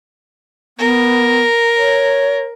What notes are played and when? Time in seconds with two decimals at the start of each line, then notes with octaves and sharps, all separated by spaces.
0.78 B3 A#4
1.77 C#5